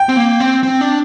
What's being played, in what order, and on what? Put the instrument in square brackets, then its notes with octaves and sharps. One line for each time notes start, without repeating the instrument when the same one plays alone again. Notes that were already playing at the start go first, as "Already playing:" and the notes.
Already playing: [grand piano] G5
[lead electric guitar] C4
A#3
C4
C4
D4